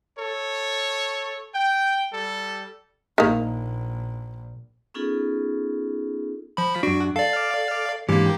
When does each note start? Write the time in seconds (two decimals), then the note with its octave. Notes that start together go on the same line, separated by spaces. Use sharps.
0.19 A4 C#5
1.55 G5
2.12 G3 A4
3.18 A#1 D#3 A#3
4.94 B3 C#4 D#4 F4 G#4 A4
6.57 F3 B5
6.83 F#2 D4 F#4
7.16 A4 D5 F5
8.09 G#2 E3 A#3 D4 G4